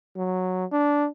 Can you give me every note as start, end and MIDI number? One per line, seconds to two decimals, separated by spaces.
0.17 0.65 54
0.72 1.07 62